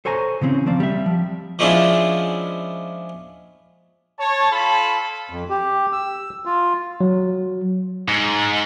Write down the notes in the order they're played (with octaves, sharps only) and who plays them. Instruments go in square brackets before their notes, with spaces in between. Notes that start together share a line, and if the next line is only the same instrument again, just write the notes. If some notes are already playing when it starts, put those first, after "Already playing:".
[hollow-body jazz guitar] A4 C5 C#5 G#5 A#5
C#3 E3 C4 C#4
F3 A#3 C4 C5 D5
G3 E5
F3
[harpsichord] F3 G#3 C#4 D4 E4 F4
[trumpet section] C#5 A5
F4 A4 A5 B5
[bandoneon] F2
G4
E6
F4
[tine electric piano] F#3
[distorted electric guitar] G#2